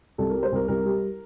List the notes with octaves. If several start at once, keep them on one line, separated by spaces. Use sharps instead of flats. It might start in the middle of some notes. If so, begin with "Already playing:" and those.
C2 A4
A#4
G3
C5
C2 A#4
C2 A#4
G3